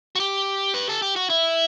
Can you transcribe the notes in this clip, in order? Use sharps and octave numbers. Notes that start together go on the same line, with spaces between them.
F#4
G4
B4
A4
G4
F#4
E4